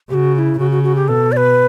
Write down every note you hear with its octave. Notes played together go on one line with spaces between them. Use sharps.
C#3 F#4 G4
F#4
E4
C#3 F#4
F#4
F#4
G4
B2 A4
D5
B4